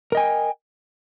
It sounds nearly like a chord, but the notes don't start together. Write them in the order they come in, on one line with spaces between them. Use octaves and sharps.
A#4 D#5 G#5 G5